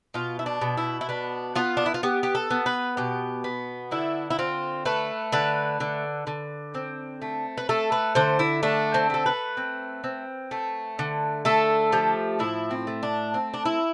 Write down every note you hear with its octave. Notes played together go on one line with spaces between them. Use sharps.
B2 F4
E4
D4
B2
E4
E4
B3 D4
B3 F4
D4
E4
F4
B3 G4
G4
A4
B3
B4
B2 G4
B3
D3 E4
E4
C4 F4
A3 B4
D3 B4
D3
D3
C4
A3
B4
A3 A4
B4
D3 C5
E4
A3 D4
C4
A3 A4
B4
C4
C4
A3
D3
A3 A4
F3 G4
A2 E4
C4
A3
D4
C4
D4
E4